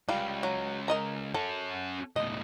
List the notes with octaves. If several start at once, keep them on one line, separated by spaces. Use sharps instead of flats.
C#2 G3 F4 F5
F#3
A#4 D#5 A#5
C#4 F#4 A4
C#2 A2 D#5